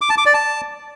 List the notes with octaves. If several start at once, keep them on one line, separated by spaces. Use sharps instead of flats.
D6
A5
D6
D5
A5